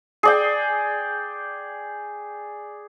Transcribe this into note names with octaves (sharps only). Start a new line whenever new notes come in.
G#4 D5 G5